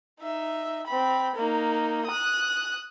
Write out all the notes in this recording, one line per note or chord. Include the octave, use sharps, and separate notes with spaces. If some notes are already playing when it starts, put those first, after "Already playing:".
D#4 E5
C4 B5
A#3 D#4
D#6 F#6